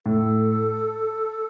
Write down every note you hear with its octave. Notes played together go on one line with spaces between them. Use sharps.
A2 A4